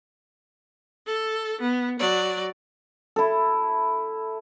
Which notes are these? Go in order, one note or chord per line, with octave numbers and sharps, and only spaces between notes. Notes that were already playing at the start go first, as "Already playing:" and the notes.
A4
B3
F#3 D5
E4 A4